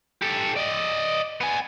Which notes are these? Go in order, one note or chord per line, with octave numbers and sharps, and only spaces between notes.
G4 A4
D5 D#5
B3 G#5